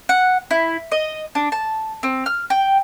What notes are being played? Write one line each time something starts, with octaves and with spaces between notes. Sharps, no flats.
F#5
E4
D#5
D4
A5
C4
F6
G5